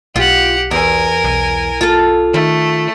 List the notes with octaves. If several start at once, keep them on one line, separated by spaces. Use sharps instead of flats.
B1 F4 G4 F#5
E2 A#4 G#5
B1
F4 A4
D#3 A3